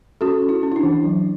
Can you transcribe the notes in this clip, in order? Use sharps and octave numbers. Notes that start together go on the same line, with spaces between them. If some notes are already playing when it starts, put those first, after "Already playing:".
C#4 F#4 A4
C#4
E4
C#4
E4
D4
E3
F#3